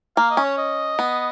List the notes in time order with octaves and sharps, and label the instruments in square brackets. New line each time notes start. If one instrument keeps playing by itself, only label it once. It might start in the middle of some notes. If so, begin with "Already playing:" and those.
[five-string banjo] A#3 [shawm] F5
[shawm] D#5
[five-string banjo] C#4
[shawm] C#5
D#5
[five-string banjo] B3